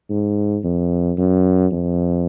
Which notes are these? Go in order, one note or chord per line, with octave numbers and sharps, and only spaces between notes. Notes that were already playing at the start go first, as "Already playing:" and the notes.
G#2
F2
F#2
F2